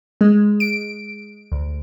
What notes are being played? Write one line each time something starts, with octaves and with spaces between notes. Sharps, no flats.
G#3
D7
D2